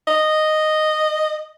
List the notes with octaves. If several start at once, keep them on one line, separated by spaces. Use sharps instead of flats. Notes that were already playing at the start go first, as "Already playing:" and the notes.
D#5